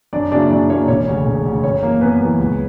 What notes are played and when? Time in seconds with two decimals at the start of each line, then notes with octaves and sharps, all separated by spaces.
0.13 F#2 D4 D5
0.31 C#3 F#3 A#3 D4 E4 D5
0.50 F#2 D4 D5
0.70 C#3 F#3 A#3 C#4 E4 C#5
0.88 E1 C#4 C#5
1.07 D2 C#3
1.25 E1
1.45 D2 C#3
1.63 F#2 C#4 C#5
1.83 E3 A#3
2.01 F#2 B3 B4
2.20 E3 A#3
2.39 C#2